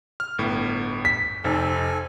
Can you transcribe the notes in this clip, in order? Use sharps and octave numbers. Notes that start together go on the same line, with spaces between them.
F6
G1 A2 B3
B6
F1 D#4 A4 C5 G#5